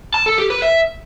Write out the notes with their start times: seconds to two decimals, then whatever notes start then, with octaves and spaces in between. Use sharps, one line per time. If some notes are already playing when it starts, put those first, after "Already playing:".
0.14 A5
0.26 A4
0.38 G4
0.50 B4
0.62 E5